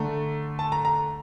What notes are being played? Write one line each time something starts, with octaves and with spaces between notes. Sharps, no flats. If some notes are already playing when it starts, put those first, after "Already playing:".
Already playing: D3 A3 A#5
A5
A#5
A#5